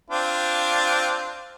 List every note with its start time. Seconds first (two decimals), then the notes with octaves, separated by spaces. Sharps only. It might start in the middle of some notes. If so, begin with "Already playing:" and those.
0.10 C4 D4 F4